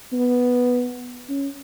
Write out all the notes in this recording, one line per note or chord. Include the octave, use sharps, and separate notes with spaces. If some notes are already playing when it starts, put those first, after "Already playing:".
B3
C#4